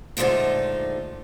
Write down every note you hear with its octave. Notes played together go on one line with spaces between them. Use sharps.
A#2 D3 F3 G#3 A3 D#4